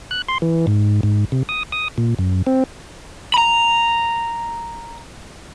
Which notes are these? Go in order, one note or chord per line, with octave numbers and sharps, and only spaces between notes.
F#6
C6
E3
G#2
G#2
C3
D#6
D#6
A#2
F#2
C4
A#5 B5